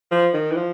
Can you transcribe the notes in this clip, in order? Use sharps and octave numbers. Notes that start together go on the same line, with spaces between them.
F3
D#3
E3
F3